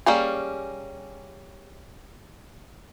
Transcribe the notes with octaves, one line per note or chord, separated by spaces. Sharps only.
G3 A#3 C#4 G#4